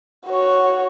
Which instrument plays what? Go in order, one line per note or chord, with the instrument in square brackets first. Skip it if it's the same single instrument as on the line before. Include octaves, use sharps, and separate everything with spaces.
[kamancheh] F#4 C#5